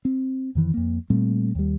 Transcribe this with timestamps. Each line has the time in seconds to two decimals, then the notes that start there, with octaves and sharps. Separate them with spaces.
0.05 C4
0.55 F2 D#3 E3
0.74 F2 A#3
1.10 A#2 G3 A3 C4
1.55 D#2 G3